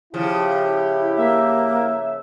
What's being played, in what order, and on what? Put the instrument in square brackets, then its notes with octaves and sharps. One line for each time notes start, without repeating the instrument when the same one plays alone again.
[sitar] C#3 F3 [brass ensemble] E4 G4
[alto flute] A#3 [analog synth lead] E5